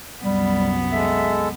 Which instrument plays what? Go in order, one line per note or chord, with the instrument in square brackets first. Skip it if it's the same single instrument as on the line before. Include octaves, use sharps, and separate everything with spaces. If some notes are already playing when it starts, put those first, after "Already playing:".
[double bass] C2 F#2 [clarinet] G3 [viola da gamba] B3
[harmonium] G#3 A4 [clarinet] E5